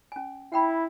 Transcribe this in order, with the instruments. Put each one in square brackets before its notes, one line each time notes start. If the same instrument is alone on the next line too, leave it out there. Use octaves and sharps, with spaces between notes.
[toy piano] C#4 G#5
[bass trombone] E4 [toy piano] F#5 G5 B5